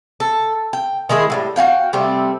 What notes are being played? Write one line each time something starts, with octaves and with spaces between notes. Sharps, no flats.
A4
G5
D#3 G#3 E4 G#4
A2 F#3 G3
F#4 G#4 F5 G5
C3 G3 A3 C4